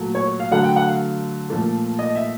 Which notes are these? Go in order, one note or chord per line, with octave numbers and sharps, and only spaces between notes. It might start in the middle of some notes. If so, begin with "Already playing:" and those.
Already playing: A#2 F#3 A3
C#5
F5
D3 F#3 A3 F#5
G5
F#5
F5
A#2 F3 A3
D#5
E5